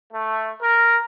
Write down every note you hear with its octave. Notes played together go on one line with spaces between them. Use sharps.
A3
A#4